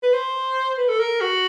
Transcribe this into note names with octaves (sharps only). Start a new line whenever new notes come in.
B4
C5
B4
A4
A#4
F#4